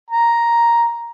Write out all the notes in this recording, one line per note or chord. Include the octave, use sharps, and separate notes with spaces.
A#5